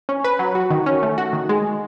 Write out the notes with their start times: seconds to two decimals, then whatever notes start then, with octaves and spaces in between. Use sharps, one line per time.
0.09 C#4
0.24 B4
0.39 F#3
0.55 F#4
0.70 D#3
0.86 C#4
1.03 A3
1.18 F#4
1.33 D#3
1.49 G#3